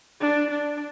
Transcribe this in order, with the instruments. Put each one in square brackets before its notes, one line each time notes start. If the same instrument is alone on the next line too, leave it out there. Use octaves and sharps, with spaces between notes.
[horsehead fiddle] D4
D4